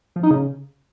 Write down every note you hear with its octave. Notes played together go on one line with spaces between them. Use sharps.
F3
D#4
C#3